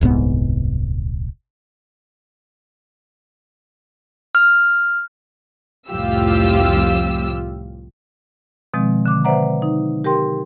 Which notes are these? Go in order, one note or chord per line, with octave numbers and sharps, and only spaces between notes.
D#1 C2 G#2 B3
F6
C2 F2 A2 F4 G4 E6
B2 D#3 F3 G#3 C4
D3 D6
B4 C5 D5 E5 F#5 A#5
D#4
G4 A#4 G5 C6